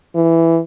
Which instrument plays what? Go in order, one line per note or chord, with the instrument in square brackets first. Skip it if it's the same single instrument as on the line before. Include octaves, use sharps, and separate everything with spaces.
[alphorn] E3